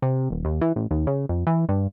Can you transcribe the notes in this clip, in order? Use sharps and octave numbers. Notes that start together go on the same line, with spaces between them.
C3
D#1
D#2
E3
A1
D#2
C#3
F2
E3
G2